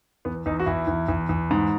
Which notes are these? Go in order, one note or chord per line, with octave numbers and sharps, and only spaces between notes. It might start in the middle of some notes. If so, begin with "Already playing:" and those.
E2 B3
E2 D#4
F#4
E2 E4
E2
E2
E2
G#2